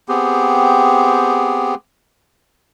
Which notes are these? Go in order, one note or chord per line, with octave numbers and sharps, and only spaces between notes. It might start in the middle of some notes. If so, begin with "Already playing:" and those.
B3 C4 G4 G#4